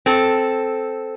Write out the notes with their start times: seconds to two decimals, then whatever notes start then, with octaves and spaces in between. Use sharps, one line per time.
0.06 C4 A4